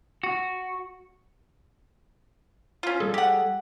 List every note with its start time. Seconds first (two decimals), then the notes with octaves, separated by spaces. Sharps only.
0.23 F#4
2.83 C#4 F4
3.00 G3 G#4 A4
3.14 G4 F#5